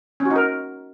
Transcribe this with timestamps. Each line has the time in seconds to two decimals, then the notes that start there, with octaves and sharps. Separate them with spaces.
0.20 C#4
0.25 F#4
0.30 D#4
0.36 A#4